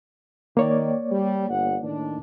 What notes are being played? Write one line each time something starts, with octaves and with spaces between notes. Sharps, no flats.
D#3 A#3 C#5 D5
G3
G1 F#5
A2 D#3 D4